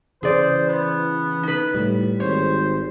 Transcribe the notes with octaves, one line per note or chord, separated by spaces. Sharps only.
C#3 E3 G#4 C5 D5
B3
D#4 B4
A2 G3
G#1 C5 C#5